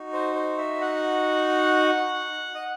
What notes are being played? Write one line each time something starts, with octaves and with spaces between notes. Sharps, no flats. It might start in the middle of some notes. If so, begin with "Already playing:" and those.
Already playing: D#4 F#4
C5
C5
E5
F#5
D#5